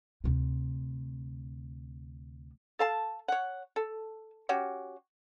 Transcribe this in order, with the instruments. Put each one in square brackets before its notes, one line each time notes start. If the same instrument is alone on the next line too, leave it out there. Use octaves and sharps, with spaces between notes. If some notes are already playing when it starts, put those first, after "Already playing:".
[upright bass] D2 C3
[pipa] A4 F5 A5
C#5 F#5
A4
C#4 F#4 G4